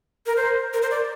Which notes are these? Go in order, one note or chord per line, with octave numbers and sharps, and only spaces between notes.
A#4
C5
A#4
C5
D5